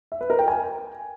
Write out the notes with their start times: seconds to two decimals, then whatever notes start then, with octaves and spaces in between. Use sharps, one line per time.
0.12 E5
0.21 B4
0.30 A#4
0.39 G5
0.48 G#5